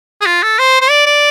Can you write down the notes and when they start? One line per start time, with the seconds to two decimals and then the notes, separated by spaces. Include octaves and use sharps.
0.21 G#4
0.26 F4
0.43 A4
0.59 C5
0.81 C5
0.90 D5
1.06 D5